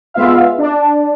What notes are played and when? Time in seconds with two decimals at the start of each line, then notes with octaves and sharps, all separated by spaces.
0.14 G#3 B3 F4 E5 F5
0.58 D4